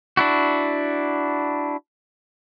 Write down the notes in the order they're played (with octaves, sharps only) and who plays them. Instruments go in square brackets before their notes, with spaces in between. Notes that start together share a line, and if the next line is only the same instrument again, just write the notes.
[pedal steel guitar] D4 E4 F#4